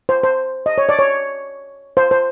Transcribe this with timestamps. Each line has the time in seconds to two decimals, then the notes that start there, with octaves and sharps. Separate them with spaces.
0.09 C5
0.23 C5
0.66 D#5
0.78 C#5
0.89 D5
0.99 C#5
1.97 C5
2.11 C5